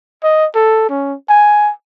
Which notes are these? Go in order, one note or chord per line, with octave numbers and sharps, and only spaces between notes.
D#5
A4
C#4
G#5